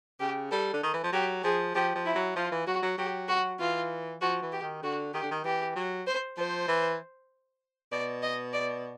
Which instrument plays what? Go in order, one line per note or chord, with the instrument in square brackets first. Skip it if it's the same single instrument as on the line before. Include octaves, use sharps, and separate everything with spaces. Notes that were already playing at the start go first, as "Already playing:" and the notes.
[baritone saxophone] C#3 [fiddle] G4
[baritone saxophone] G3 [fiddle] A4
[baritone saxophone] D3
D#3
E3
F3
[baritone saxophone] F#3 [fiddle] G4
[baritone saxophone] F3 [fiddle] G#4
[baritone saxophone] F3 [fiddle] G4
[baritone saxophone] F3
[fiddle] E4
[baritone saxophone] F#3
[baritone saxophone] F3 [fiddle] F4
[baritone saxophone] E3
[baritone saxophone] F#3 [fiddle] F#4
[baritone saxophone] F#3
[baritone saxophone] F#3 [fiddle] G4
[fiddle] F#4
[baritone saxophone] E3 [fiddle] F4
[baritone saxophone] F3 [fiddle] F#4
[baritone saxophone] E3
[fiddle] G4
[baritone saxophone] D#3
[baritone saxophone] D3 [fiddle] F#4
[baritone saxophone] D#3 [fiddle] G4
[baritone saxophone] D3
D#3
[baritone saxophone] E3 [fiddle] G4
[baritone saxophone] F#3
[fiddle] C5
[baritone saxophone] F3 [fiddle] C5
[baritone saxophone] E3
[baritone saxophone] B2 [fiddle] D5
[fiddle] D#5
D5